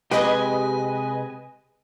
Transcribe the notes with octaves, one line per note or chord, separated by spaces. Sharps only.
C3 G#3 G4 B4 D#5 G#5